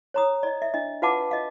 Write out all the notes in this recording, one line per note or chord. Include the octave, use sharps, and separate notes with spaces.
C#5 A#5 D#6
D5 D#5
E5
D4 D#5
F4 B4 F5 F#5 A5 D6
D#5 F5